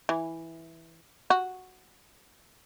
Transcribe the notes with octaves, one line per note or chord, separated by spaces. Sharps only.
E3
F#4